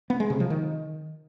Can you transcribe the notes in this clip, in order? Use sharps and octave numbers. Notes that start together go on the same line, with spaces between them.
B3
G#3
C3
F3
D#3